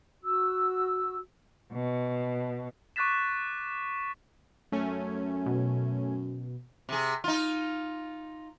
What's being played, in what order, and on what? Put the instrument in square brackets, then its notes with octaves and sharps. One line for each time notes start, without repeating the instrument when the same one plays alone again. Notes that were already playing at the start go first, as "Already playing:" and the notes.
[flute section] F#4 E6
[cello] B2
[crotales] C#6 D6 F#6 A6 B6 E7
[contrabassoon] F#2 [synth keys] A3 C#4 G#5
[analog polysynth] B2
[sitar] C3 G#4
D#4 F4